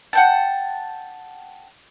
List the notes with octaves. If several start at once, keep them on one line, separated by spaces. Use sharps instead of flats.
F#5 G5 A5